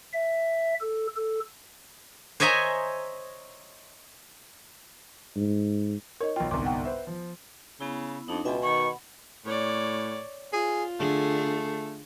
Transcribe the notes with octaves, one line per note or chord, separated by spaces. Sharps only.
E5
A4
A4
C5 C#5 D#5 E5 G#5 A#5
G#2
D#4 A#4 C#5 D#5
B1 F4 G5
G1 C2 G#2 B3 C6 D6
F#5 G5
B4 C5 E5
F3
C#3 B3 E4
F2 D4 D#4
C#2 B2 E5 G5 G#5
D#3 F#5 B5 C#6
A2 C#5 D5
F4 G#4
D3 A3 G#4